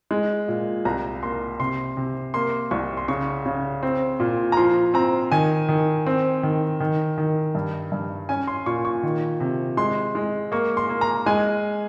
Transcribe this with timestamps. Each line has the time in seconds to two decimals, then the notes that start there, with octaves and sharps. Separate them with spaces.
0.11 G#3
0.48 A#2
0.85 C2 A#5
1.23 A#3 C6
1.60 C3 C6
1.97 C3
2.34 A#3 C6
2.71 C2 C#6
2.97 C6
3.08 C#3 C#6
3.46 C#3
3.83 C4
4.20 A#2
4.52 A#5
4.57 F3 C6
4.94 C4 A#5
5.32 D#3 G#5
5.68 D#3
6.06 C4
6.43 D#3
6.80 D#3
7.18 D#3
7.55 G2
7.92 G2
8.29 C#4 G#5
8.47 C6
8.66 A#2 C#6
8.85 C#6
9.03 D#3
9.40 C3
9.77 G#3 C6
10.15 G#3
10.52 A#3 C#6
10.77 C6
10.89 A#3
11.01 A#5
11.26 G#3 G#5